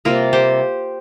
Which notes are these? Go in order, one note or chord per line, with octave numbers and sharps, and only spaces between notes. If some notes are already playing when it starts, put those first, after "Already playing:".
C3 G3 A#3 F4 A#4
G4 C5